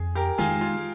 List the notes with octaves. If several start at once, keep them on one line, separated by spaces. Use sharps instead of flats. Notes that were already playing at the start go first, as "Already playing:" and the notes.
Already playing: F2 G#4
G4 A#4
D#3 G#3 F4 G#4
F4